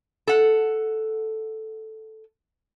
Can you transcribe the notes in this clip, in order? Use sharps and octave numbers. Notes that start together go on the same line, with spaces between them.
A4 F#5